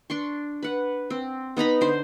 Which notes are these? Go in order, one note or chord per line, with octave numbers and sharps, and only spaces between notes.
D4 C6 C#6
B4 F#5
C4
B3 D#4 A#5 B5
D3 C5